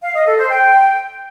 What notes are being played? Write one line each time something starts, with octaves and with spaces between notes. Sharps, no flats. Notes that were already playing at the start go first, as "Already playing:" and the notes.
F5
D#5
A4
C5
G5